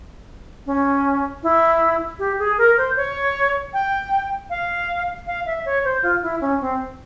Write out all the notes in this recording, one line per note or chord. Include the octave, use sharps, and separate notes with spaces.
C#4
E4
G4
G#4
A#4
C5
C#5
G5
F5
F5
E5
C#5
C5
F4
E4
C#4
C4